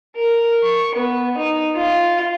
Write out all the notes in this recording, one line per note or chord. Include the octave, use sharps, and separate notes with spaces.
A#4
C#6
B3
D#4
F4